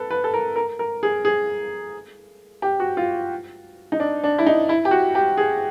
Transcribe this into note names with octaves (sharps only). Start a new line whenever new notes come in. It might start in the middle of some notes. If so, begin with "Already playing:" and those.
Already playing: A4 B4
B4
A4
A#4
A#4
A#4
G#4
G#4
G4
F#4
F4
D#4
D4
D4
E4
D#4
E4
G4
F#4
G4
G#4